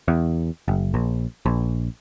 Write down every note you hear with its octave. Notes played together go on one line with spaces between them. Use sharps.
E2
F#1
A#1
A#1